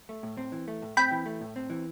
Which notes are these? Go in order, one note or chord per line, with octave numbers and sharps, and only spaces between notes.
A3
A2
C4
E3
A3
A2
C4 G5 B5
E3
A3
A2
C4
E3